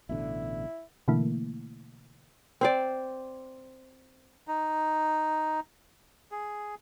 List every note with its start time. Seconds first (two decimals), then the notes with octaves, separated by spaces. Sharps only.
0.09 A1 B2 D3 E4
1.08 B2 D3 E3 A3 A#3 E4
2.61 C4 C5 D5
4.48 D#4
6.32 G#4